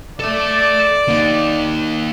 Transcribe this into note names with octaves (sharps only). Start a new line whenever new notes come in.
A4 D5 E5
A#3 D#4